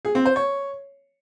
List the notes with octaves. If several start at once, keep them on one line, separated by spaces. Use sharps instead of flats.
G#4
C4
C5
C#5